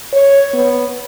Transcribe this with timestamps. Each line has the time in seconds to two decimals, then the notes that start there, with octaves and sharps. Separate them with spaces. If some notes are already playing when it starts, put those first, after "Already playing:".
0.13 C#5
0.53 B3